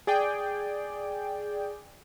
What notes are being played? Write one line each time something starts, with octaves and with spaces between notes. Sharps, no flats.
G#4 D5 G5